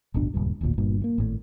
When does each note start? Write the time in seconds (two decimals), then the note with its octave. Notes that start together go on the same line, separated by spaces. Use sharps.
0.14 D1 G1 B2 D4
0.34 D#1 C#2 G2
0.61 D1 G#1 D2 A#2
0.78 G1 G2 A#2
1.01 D#3 A#3
1.18 G#1 A2